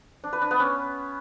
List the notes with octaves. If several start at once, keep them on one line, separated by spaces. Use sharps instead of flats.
D4
B4
D4
B3
C#4